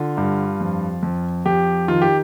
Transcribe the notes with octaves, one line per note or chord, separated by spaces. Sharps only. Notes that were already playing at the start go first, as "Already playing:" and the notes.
Already playing: D3 F4
G2
F2
F2
F2 G4
D#3 F4
G4